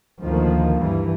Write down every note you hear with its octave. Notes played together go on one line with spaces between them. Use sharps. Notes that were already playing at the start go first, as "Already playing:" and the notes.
D2 D#3 F3 A#3
G2 E3 G3